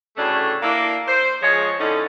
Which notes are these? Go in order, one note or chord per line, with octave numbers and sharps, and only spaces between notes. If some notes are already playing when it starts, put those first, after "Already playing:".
D2 A2 C#3 A3 C#4 D4
A#3 D4 E4
C5
F3 G#3 C#5
A2 D3 A3 C#4 D#4